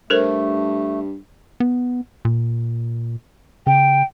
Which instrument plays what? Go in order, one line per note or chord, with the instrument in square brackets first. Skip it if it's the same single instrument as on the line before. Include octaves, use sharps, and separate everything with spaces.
[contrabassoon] G2 [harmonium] A3 [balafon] A4 A#4 C5
[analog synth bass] B3
A#2
[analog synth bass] C#3 [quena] G5